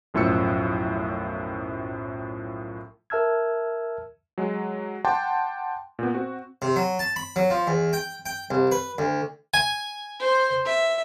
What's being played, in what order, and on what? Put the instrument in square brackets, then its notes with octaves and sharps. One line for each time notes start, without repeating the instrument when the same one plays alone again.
[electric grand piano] B1 F#2 A2 F3 E6 C#7
[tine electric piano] A#4 E5 A5 E6 F6 G#6
[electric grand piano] F#3 G#3
F#5 G5 A5 C6 D6
A#2 B3
C4 F#4
[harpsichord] C3
F#3
A5
B5
F#3
F3
E2
G5
G5
C2
B4
D2
G#5
[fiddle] C5
E5